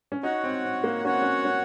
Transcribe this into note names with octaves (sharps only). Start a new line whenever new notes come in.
C#4
D#4 F#4 C#5 F#5
C4
C4
A#3
C#4 F#4 C#5 F#5
C4
C#4
C#4